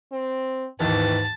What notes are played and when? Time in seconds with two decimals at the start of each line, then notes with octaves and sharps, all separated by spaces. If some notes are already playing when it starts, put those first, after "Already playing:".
0.12 C4
0.80 D#2 G#2 D#3 E3 B4 A5